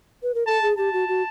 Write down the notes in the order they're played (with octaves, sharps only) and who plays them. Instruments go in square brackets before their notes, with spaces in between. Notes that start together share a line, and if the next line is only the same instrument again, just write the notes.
[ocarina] B4
A#4
[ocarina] A4 [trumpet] A5
[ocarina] G#4
[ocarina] G4 [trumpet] A5
[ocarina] F#4
F#4